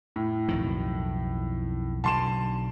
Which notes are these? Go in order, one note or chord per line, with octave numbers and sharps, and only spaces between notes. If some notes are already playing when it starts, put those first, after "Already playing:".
A2
B1 F2 D#3
B1 D3 A5 C6 E7